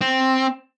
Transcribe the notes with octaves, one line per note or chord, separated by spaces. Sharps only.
C4